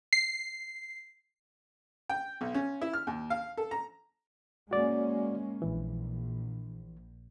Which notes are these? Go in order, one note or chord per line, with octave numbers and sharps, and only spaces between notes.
C7
G5
B1
C#4
E4
F6
D#2
F5
A4
A#5
G#3 A#3 C#4 F#4 D5
A#1 E3